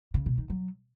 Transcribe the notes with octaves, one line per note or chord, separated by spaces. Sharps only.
C#3
B2
D#3
F#3